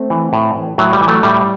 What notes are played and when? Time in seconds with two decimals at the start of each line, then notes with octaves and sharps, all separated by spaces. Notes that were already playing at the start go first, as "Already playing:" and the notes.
Already playing: A3 C4
0.10 E3
0.33 A2
0.55 E3
0.78 A2 F#3
0.93 G3
1.01 E3
1.08 F#3 A3
1.23 A2 G3